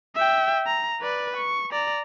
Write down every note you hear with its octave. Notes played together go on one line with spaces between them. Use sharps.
E5 G5
A#5
B4 D5
C#6
D5 A#5